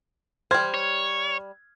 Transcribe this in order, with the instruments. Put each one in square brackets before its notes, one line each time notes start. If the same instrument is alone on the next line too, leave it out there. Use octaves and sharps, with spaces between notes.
[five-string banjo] G3 C5 [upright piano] F6 G#6
[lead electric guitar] C#5